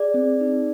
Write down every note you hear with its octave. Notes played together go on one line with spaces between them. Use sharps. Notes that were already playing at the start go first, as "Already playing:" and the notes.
Already playing: G#4 D5
C4
D#4